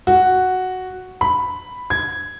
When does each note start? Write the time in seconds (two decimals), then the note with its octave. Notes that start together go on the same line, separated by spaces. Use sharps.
0.07 F#4
1.21 B5
1.90 G#6